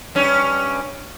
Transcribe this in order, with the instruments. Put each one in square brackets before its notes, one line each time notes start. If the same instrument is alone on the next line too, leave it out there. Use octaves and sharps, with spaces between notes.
[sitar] G2 C#4